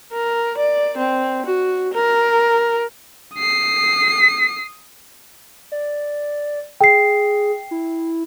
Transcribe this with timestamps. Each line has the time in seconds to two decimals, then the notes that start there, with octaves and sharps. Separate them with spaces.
0.13 A#4
0.58 D5
0.98 C4
1.46 F#4
1.94 A#4
3.35 D#6 C7
5.72 D5
6.81 G#4 G5 C7
7.71 E4